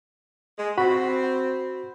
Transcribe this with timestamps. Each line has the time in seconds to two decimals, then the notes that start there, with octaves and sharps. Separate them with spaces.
0.58 G#3
0.78 C4 F#4 B5